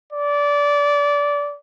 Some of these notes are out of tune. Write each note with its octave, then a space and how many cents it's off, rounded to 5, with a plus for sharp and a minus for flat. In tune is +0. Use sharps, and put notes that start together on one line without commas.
D5 -20